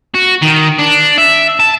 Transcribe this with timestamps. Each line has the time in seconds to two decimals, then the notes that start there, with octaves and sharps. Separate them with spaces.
0.14 F#4
0.42 D#3
0.78 D4
1.18 E5
1.60 A5